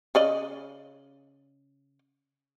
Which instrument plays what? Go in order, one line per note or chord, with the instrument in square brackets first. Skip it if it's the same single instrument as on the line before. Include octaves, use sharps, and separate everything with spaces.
[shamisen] C#3 D5 D#5